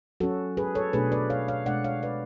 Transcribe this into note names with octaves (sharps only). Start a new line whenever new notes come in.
F#3 C#4 F#4 A4
G#4 B4
A4 C#5
B2 A3 D4 G#4 B4
B4 D5
C#5 F5
C#5 F5
B2 G#3 D4 D5 F#5
C#5 F5
B4 D5